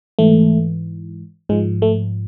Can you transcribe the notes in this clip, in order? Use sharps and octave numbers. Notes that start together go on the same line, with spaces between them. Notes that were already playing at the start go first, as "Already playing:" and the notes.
G#2 E3 A3
G#2 F3 G#3
A3